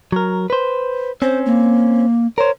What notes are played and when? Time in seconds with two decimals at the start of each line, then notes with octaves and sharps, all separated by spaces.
0.12 F#3 A#4
0.50 B4 C5
1.22 C4 C#4 C5
1.46 A#3
2.38 A#4 C5 C#5